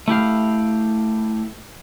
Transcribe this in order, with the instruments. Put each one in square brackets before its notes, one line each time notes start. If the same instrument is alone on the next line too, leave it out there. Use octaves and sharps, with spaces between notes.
[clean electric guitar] A3 E4 G4 F5